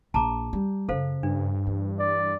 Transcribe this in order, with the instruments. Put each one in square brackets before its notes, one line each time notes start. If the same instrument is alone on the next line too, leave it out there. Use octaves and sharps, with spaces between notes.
[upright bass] A#1 [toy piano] A5 A#5 D6
[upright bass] G3
[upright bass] F#2 C#3 [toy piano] A4 C5 F5
[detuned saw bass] G2 [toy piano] D4
[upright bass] E3
[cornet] D5